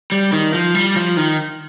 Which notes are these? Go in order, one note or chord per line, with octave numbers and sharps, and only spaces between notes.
G3
D#3
F3
G3
F3
D#3